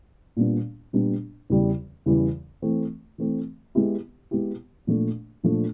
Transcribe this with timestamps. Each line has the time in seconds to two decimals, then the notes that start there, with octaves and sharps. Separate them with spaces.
0.37 A#2 G3 B3 D4
0.93 A#2 G3 B3 D4
1.50 E2 C#3 E3 G3
2.06 E2 C#3 E3 G3
2.62 E3 A3 C4
3.18 E3 A3 C4
3.75 G#3 B3 E4 G4
4.31 G#3 B3 E4 G4
4.87 A#2 F3 A3 D4
5.44 A#2 F3 A3 D4